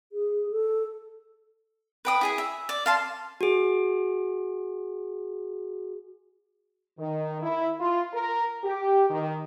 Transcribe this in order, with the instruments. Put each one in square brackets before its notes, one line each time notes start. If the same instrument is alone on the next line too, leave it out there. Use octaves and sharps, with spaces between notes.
[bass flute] G#4
A4
[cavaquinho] B4 G5 D#6
E4 G#4 G#5
E5
D5
F5 A5 C6
[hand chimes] F#4 G#4
[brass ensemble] D#3
E4
F4
A#4
G4
D#3